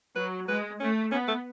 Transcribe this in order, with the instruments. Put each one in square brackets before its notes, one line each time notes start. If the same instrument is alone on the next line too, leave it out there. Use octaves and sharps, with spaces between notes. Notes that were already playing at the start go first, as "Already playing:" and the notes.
[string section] F#3 [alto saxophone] B4
[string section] G#3 [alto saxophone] B4
[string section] A3 [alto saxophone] C#4
[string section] B3 [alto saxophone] C#4
[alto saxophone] A3